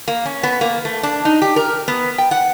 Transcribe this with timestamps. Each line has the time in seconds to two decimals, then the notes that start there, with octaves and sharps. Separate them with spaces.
0.08 A#3
0.26 C#4
0.43 B3
0.61 A#3
0.85 A3
1.03 D4
1.25 D#4
1.42 G4
1.56 A#4
1.88 B3
2.18 G5
2.31 F#5